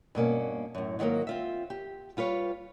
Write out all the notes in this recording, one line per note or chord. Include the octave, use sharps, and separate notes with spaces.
G2 B2 A#3 C#4
F#2 A2
G#2 D#3 F#3 A3 A#3
C4 F4 E5
G4
G3 F4 B4 C#5